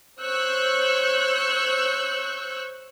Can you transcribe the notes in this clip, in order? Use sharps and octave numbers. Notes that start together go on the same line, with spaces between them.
C5 C#5 C#6 E6 F#6 G6